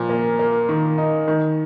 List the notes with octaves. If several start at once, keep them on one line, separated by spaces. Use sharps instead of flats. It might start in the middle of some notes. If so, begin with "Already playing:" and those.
Already playing: A#2 F3
A#3
A#3
D#3
D#4
D#3